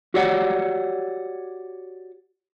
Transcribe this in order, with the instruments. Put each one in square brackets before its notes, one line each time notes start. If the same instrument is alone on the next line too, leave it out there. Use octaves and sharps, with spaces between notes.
[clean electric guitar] F#4 G4 C#5 D5 F#5